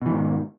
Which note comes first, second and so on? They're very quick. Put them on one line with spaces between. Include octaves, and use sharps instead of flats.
B2 E3 G#2 D#3